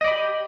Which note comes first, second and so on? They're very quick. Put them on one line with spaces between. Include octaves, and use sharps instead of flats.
D#5 D5 B5 G4